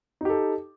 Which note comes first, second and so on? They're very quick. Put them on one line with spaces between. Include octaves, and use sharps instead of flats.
D#4 G4 A4